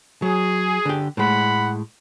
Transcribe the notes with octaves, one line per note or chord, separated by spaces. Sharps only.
F#3 G#4
D3 G4
A2 G#3 F#5 B5